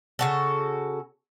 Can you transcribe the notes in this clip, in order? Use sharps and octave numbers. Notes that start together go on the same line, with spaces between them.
C#3 F#4 A4